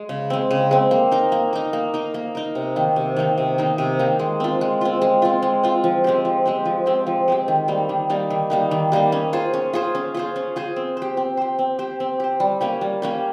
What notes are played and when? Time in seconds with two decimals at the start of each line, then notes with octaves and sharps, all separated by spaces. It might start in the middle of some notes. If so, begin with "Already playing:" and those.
Already playing: G#3
0.09 C#3
0.30 G#3 C4
0.51 C#3
0.71 G#3 C4
0.91 A#3
1.11 D#4 A#4
1.32 A#3
1.53 D#4 A#4
1.73 A#3
1.94 D#4 A#4
2.14 A#3
2.35 D#4 A#4
2.55 C3
2.76 D#3 A#3 D#4
2.96 C3
3.16 D#3 A#3 D#4
3.38 C3
3.58 D#3 A#3 D#4
3.78 C3
3.99 D#3 A#3 D#4
4.19 G#3
4.40 C4 F4
4.61 G#3
4.81 C4 F4
5.02 G#3
5.22 C4 F4
5.42 G#3
5.63 C4 F4
5.84 F3
6.04 G#3 C4 G4
6.25 F3
6.46 G#3 C4 G4
6.65 F3
6.86 G#3 C4 G4
7.07 F3
7.28 G#3 C4 G4
7.48 D#3
7.68 G3 A#3 D#4
7.89 D#3
8.09 G3 A#3 D#4
8.30 D#3
8.50 G3 A#3 D#4
8.71 D#3
8.92 G3 A#3 D#4
9.12 C#4
9.33 F4 G#4 C5
9.54 C#4
9.73 F4 G#4 C5
9.95 C#4
10.14 F4 G#4 C5
10.36 C#4
10.56 F4 G#4 C5
10.76 C4
10.97 G4 C5
11.17 C4
11.37 G4 C5
11.59 C4
11.79 G4 C5
12.00 C4
12.20 G4 C5
12.40 G3
12.61 A#3 C#4 G4
12.81 G3
13.02 A#3 C#4 G4